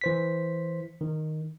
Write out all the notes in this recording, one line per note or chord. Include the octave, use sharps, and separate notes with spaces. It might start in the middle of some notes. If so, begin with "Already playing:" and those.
E3 C5 B6
D#3